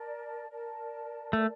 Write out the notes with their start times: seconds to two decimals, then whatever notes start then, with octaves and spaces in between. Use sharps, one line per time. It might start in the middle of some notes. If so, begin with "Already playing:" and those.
Already playing: A#4 D5 A5
0.49 A#4 D5 A5
1.33 A3 A#4 D5 A5